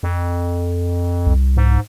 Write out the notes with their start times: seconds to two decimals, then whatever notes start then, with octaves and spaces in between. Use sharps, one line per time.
0.03 F2
1.26 C2
1.57 G#2